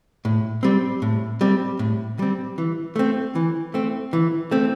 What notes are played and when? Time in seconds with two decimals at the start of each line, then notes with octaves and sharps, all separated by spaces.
0.25 A2
0.63 G3 C4
1.02 A2
1.41 G3 C4
1.79 A2
2.19 G3 C4
2.58 E3
2.96 A3 C4
3.35 E3
3.74 A3 C4
4.13 E3
4.51 A3 C4